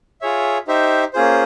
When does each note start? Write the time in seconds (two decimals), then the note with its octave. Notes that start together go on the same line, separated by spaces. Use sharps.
0.21 F4 G#4 C#5 E5
0.67 D#4 G4 C5 E5
1.13 A#3 C#4 F4 G#4 C5